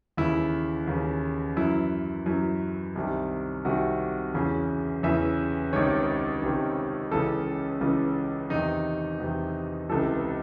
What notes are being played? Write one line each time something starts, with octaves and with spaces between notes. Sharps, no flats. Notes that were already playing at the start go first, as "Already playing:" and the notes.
D#2 C#3 E3 E4
D#2 C#3 E3
F#2 E3 E4
F#2 E3
C2 C3 D#3
C2 C3 D#3 F#4
E2 C#3 E3
E2 C#3 E3 E5
C#2 C3 D#3 C#5
C#2 C3 D#3
C#2 C#3 E3 A4
C#2 C#3 E3
E2 C3 D#3 D#4
E2 C3 D#3
C#2 C3 E3 A4